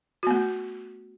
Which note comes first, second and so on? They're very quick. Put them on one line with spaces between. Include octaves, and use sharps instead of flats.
F#4 B3 A3